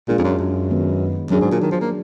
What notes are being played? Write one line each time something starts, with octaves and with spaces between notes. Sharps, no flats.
A#2 G#3 D4 F4 G#4
F2
F#2
F#2
D#3 G#3 B3
F#2 F#3 D4 G#4
G#2
A#2
D#3
F3
A#3